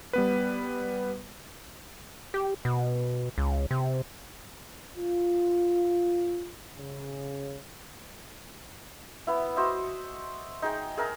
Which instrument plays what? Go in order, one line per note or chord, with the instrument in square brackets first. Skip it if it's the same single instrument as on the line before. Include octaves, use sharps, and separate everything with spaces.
[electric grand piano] G3 B3 B4
[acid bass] G4
B2
C#2
C3
[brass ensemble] F4
C#3
[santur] B3 E4
F#4 C5 D#5 E5
D#4 G#4 G5
G#4 A#4 E5 A#5